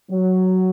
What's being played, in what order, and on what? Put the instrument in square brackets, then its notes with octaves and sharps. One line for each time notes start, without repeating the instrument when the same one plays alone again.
[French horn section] F#3